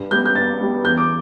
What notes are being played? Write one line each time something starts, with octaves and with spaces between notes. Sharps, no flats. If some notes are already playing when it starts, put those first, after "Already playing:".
Already playing: G2
G3 B3 G6
G6
G2 A6
G3 B3
E2 G6
D6